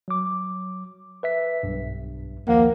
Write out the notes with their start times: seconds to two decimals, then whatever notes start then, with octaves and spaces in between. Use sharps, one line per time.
0.08 F#3 D6
1.23 B4 E5 B6
1.63 B1 G2
2.48 D#2 F3 A#3 F#5